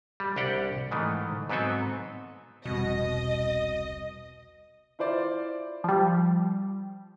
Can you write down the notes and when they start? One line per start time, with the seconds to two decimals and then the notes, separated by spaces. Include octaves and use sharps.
0.20 G3
0.36 C2 D4 G4 F#5 G5
0.91 G#2 D#3 E3 A3
1.49 G#2 F#3 B3 C4 A4 G#5
2.65 E1 C2 B2 D#5
4.99 E4 F4 C5 D5
5.84 F3 G3